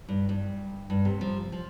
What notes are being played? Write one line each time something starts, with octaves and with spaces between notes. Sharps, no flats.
G2
G2
G2
C3
F3
F3